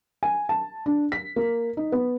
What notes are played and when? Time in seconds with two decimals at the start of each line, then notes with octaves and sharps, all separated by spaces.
0.23 G#5
0.49 A5
0.86 D4
1.12 B6
1.36 A#3
1.77 D#4
1.92 B3